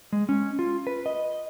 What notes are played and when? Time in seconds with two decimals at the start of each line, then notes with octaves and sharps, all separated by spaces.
0.13 G#3
0.29 C#4
0.59 F4
0.87 B4
1.06 D#5